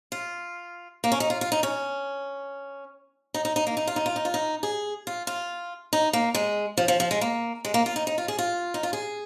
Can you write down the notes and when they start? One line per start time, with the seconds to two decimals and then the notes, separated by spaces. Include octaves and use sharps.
0.12 F4
1.04 A#3
1.12 C#4
1.20 D#4
1.30 F4
1.41 F4
1.52 D#4
1.63 C#4
3.34 D#4
3.45 D#4
3.56 D#4
3.67 A#3
3.77 D#4
3.87 F4
3.96 D#4
4.06 F4
4.16 D#4
4.25 F4
4.34 D#4
4.63 G#4
5.07 F4
5.27 F4
5.93 D#4
6.13 A#3
6.35 G#3
6.77 F3
6.88 F3
7.00 F3
7.11 G#3
7.21 A#3
7.65 G#3
7.74 A#3
7.86 F4
7.96 D#4
8.07 D#4
8.18 F4
8.28 G#4
8.39 F4
8.74 D#4
8.83 F4
8.93 G#4